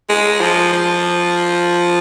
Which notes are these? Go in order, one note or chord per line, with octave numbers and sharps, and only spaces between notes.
G#3
F3
F3